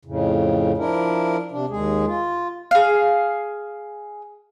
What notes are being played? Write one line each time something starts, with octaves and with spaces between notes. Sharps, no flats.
F2 A2 C#3
F3 D4 E4 A#4
C3 D4
D#2 G#3 G#4
F4
G#4 F5